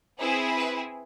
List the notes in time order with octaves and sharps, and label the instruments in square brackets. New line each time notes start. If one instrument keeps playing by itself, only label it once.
[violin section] C4 E4 G#4 B4
B4